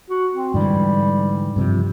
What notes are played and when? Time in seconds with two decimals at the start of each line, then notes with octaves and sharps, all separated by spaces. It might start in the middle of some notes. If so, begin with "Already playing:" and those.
0.10 F#4
0.34 C4
0.54 G#2 D3 E3 G3
1.56 G2 C3 F3